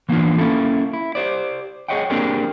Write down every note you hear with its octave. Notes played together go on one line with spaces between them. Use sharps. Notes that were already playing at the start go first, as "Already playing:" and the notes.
E3 A#3 B3 C#4 D4 F4
A#3 C#4 E4 A4
E4
G4 C5 D5
G#4 A#4 C#5 D#5 F#5 G5
A#3 C4 D4 G4 G#4 A#4